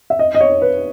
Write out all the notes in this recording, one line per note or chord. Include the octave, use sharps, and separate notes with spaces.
E5
D#5
D#5
C#5
B4